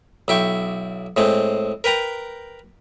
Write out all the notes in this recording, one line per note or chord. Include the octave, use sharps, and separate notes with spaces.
B1 E4 G5 C#6
A2 G#3 C4
A#4 B4 G5 A#5